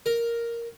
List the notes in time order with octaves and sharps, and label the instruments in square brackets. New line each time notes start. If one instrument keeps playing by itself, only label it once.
[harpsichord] A#4